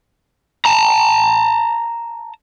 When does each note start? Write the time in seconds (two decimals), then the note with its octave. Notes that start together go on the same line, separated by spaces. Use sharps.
0.65 A5 A#5